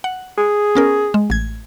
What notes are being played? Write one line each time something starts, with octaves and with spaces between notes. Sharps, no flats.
F#5
G#4
B3 C#4 A#4
G#3
A1 G#6